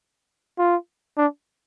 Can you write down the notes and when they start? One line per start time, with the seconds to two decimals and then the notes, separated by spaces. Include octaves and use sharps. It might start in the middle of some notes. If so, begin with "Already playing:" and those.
0.59 F4
1.18 D4